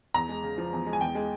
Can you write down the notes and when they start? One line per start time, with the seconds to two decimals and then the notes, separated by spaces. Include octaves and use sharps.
0.14 E2 A#5
0.29 G#3
0.43 C#3
0.58 F3
0.73 E2
0.87 G#3
0.93 G#5
1.01 E2 G5
1.15 G#3